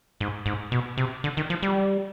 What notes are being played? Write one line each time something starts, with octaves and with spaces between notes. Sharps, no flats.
G#2
G#2
B2
C3
D3
D#3
F3
G3